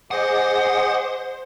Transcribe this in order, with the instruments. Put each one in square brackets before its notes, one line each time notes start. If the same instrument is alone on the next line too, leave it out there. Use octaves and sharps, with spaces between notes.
[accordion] G#4 D#5 D6 [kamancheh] C5 [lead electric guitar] F#5